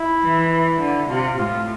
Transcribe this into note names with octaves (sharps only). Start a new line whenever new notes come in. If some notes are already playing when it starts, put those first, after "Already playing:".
Already playing: E4
E3
E4
D3
C3 F4
A2 F4